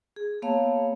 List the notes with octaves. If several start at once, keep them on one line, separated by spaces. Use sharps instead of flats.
G#4
A#3 B3 C#5 F5 A5